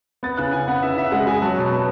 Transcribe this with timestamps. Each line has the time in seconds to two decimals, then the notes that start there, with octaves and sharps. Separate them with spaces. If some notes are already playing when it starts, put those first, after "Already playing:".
0.23 B3 A6
0.37 C#3 F#6
0.53 C#3 G#5
0.68 B3 F#5
0.83 C#3 E5
0.97 C#3 E5
1.12 G#3 F#5
1.27 G#3 G#5
1.42 F#3 A5
1.57 B2
1.72 B3